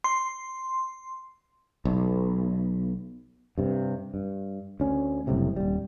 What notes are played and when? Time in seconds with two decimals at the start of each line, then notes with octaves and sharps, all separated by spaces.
0.04 C6
1.85 B1
3.58 G2 C3
4.14 G2
4.80 D2 C#4
5.27 F#1 C2 A2 C3
5.56 D#1 G3